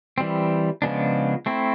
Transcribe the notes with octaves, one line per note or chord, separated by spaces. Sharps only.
E3 G3 C4
C#3 F3 G#3 B3 D4
A3 C4 E4